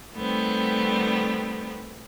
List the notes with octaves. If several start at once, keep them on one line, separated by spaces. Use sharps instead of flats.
D#3 G3 A3 B3 C4